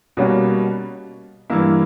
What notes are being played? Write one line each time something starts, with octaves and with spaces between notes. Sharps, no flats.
B2 G3 A#3 C#4 F#4
G2 E3 A#3 E4